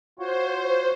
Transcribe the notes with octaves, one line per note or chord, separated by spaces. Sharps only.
F4 F#4 C5 C#5